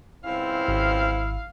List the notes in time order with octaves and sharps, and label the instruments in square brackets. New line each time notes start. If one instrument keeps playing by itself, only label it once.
[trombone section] C#2 C4 C5 [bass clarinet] E4 [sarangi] F5
[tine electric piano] G#1